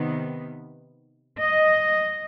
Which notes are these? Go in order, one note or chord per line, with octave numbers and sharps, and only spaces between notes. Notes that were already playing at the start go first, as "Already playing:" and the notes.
Already playing: C3 D#3 B3
D#5